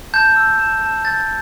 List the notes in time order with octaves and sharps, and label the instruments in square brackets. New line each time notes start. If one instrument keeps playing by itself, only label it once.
[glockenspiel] A5 G6
E6
A5
A5
G6 A6